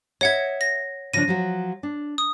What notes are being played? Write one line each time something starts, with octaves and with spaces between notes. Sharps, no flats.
C#5 D#5 E5 F#5 G#6
A#6
C#3 F3 D4 A#6 D#7
F3 F#3 F#4
D4
D#6